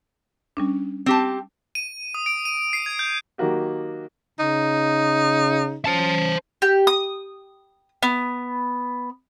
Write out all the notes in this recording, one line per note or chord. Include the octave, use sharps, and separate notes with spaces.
G3 C#4 D4
C4 G4 A5
D#7
D#6
D7
D#7
C7
G#6
G6
D#3 F#3 A#3 F#4 G4
C#3 D#4
C#4 C5 A5
G4
D#6
B3